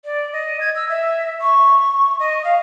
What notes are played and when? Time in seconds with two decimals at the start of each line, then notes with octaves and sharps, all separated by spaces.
0.05 D5
0.33 D#5
0.61 G#6
0.75 E6
0.89 E5
1.41 C#6
2.20 D#5
2.44 F5